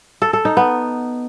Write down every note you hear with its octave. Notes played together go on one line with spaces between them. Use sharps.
A4
A4
D#4
B3